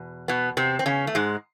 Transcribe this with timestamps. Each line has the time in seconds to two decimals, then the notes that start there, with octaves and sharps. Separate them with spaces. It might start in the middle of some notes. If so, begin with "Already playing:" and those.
Already playing: E2 B2
0.28 B2 B3
0.57 C3 C4
0.79 C4
0.86 C#3 C#4
1.07 A3
1.15 G#2 G#3